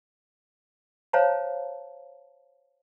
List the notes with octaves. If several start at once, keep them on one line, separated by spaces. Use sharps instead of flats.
C5 C#5 F5 A5 A#5